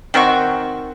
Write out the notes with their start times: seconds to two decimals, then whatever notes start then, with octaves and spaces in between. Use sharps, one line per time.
0.14 D#3 C4 F#4 C#6